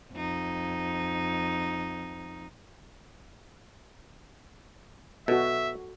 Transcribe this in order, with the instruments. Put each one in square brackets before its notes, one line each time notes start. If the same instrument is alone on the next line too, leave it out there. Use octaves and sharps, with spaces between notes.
[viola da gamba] F2 D#4
[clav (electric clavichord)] B2 [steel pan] F#4 A4 [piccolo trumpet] E5